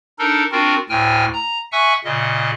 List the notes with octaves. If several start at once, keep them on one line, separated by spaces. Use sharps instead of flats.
D4 D#4 A4 A#4
C4 D4 F4 F#4 A#4
D2 A2 G5 G#5 F6
A#5
E5 F#5 G#5 C#6 E6 F#6
A#2 C#3 D#5